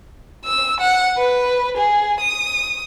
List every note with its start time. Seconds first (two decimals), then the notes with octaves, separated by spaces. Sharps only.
0.45 E6
0.80 F#5
1.17 B4
1.77 G#4
2.20 D#6